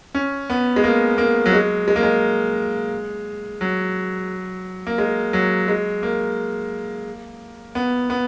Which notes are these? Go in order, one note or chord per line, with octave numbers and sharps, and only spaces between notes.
C#4
B3
G#3
A#3
A#3
F#3
G#3
G#3
A#3
G#3
F#3
A#3
G#3
F#3
G#3
A#3
B3
B3